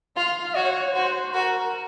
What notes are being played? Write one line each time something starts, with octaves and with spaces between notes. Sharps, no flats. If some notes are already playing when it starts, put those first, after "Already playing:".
F4 F5
F#4 C#5
F#4 C5
F#4 A#4